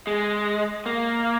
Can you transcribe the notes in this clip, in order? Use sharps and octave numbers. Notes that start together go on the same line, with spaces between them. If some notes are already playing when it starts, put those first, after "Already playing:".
G#3
A#3